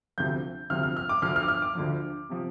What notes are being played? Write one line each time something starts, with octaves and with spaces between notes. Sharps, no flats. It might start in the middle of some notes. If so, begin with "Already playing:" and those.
D2 C3 F3 G6
D2 C3 F3 F6
F6
F6
D6
D2 D3 F3 F6
F6
D6
F6
D6
D2 D3 F3
C3 F3